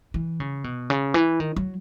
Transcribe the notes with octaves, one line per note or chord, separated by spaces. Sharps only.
E3
C#3
B2
C#3
E3
D#3
F#3